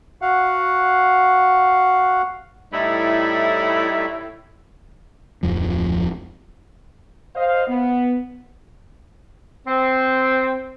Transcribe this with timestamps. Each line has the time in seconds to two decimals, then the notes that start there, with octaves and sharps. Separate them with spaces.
0.22 F#4 F5 F#5
2.72 A2 G3 D#4 E4 E5
5.43 D1 F2 F3
7.34 C5 D#5 F5
7.67 B3
9.67 C4